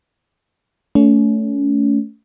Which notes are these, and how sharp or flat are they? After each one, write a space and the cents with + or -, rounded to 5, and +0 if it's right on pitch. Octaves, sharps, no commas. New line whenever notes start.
A3 +0 C#4 +35